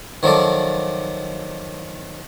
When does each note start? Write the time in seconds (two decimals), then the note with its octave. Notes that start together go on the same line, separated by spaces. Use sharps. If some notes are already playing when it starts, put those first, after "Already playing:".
0.23 D#3 F3 F#3 A4 D5